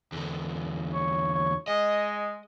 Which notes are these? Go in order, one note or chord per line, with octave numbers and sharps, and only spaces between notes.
E2 D3
C#5
C#5
G#3 D#5